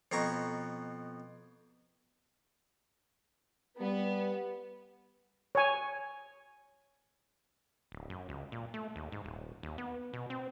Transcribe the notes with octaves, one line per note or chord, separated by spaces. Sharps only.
F2 B2 A#5 C#6
G3 B3
C#5 G#5
D1
F#2
C#2
A#2
A3
D#2
G#2
D#1
D#2
B3
B2
C4